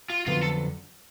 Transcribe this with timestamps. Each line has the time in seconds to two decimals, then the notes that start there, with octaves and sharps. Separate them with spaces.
0.10 F4
0.26 F2 D3 F#3 B3 F4
0.43 A4